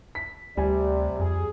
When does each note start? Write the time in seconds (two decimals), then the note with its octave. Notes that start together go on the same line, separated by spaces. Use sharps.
0.15 B6
0.57 D2 C3 G3 D5 G#5
1.19 F2 G#4